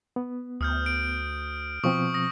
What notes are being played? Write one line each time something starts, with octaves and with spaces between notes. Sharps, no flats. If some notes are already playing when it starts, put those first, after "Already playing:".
B3
D2 D#6 F6 G6
D7
B2 F3 C4 C#6 D#6
D#6 A#6